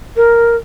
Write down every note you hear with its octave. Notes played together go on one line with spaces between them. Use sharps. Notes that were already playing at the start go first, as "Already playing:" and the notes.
A#4